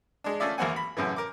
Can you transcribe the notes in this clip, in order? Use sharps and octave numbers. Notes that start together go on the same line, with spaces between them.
G#3 D4
A3 C#4 F4 D5 E5
G#1 E2 A#3 C4 F#5 G#5
B5
F#2 A2 C#3 E3
A#4 D6